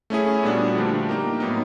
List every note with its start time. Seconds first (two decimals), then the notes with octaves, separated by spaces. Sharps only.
0.10 A3 C#4 E4 G#4
0.43 A#2 G3 B3 D4 F#4
0.75 D3 F3 A3 D4 G4
1.09 A#3 D#4 G4 A#4
1.40 A2 F#3 B3 D#4